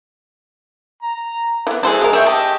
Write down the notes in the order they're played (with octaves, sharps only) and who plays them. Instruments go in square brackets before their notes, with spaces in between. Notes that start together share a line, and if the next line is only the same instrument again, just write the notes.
[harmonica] A#5
[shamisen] E3 B3
[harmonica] F#3 A3 D4 [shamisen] E4 C5 [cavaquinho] G#4 A5
[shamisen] G#3 A#4
[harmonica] B3 C#5 C#6 [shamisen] G#4 [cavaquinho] E5 G5
[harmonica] G4 D#5 [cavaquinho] A5